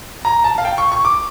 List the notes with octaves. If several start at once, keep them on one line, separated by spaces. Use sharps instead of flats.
A#5
A5
F5
G5
C#6
C#6
D6